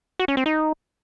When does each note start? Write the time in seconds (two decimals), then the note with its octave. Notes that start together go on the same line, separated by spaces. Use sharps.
0.19 F#4
0.28 C#4
0.37 C4
0.46 D#4